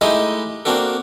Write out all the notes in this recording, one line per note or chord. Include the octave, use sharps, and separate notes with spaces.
G#3 A3 D#4 E4 G4 D#5
A#3 C4 D4 F#4 A4